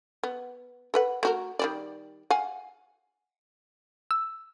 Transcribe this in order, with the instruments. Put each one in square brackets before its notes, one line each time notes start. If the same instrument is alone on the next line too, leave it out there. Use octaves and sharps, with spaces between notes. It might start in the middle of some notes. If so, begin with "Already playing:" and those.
[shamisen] B3
A4 B4 F#5
A3 F#4 A#4
D#3 G3 D5
F5 F#5 G#5
[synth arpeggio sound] E6